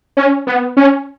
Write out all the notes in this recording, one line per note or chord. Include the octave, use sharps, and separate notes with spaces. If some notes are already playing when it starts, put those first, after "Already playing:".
C#4
B3
C#4